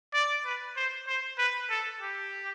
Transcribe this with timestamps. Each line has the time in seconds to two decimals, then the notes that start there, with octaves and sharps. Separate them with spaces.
0.14 D5
0.45 B4
0.77 C5
1.08 C5
1.39 B4
1.70 A4
2.02 G4